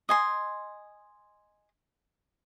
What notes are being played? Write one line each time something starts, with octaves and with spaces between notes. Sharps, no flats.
D#5 G#5 C6